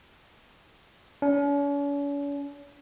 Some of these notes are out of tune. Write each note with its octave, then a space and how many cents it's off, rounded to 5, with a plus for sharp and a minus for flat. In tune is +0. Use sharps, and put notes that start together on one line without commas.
C#4 +45